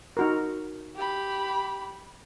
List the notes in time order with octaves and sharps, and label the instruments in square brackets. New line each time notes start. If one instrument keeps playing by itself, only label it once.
[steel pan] D#4 F#4 A#4
[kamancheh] G4 B5